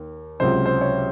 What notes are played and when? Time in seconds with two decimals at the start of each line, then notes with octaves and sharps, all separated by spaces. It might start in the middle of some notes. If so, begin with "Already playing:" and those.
Already playing: D#2
0.40 C#2 C3 F#3 C5
0.66 C5
0.81 C#5